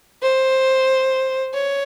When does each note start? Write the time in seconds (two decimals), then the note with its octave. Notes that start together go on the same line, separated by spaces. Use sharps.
0.23 C5
1.54 C#5